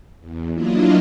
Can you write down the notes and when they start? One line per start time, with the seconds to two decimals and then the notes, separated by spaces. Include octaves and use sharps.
0.20 E2
0.54 F#3 A#3 D4 E4 F4 D#5